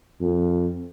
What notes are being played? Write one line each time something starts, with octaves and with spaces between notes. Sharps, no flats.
F2